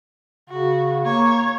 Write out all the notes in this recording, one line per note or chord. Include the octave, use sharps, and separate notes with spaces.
C#3 F#4
A#3 C#5